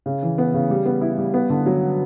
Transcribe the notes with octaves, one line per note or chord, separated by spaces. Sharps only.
C#3
E3
B3
C#3
G3
B3
E4
G3
B3
D3
F#3